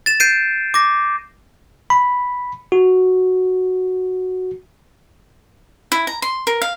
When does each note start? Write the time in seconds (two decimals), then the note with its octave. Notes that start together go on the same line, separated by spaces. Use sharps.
0.06 A6 E7
0.20 G6 C7 D7 D#7
0.74 D6 A#6
1.90 B5
2.72 F#4
5.92 E4
6.07 A#5
6.22 C6
6.47 A#4
6.62 F5